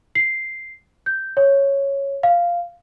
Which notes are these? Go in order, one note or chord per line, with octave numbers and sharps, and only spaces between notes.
C7
G6
C#5
F5